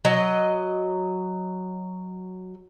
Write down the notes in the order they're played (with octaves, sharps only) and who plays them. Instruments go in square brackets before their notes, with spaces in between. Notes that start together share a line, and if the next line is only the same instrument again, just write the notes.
[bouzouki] F#3 D#5